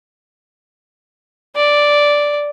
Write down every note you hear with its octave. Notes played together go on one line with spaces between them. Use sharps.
D5